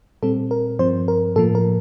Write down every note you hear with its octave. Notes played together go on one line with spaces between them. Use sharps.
A#2 G3 C4 A4
A#4
G2 F3 C4 C5
A#4
A2 F3 A#3 A4
A#4